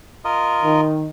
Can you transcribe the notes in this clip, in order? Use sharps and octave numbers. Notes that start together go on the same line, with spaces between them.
F4 A#4 D#5
D#3